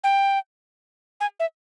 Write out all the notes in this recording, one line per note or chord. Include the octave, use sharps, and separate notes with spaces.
G5
G#5
E5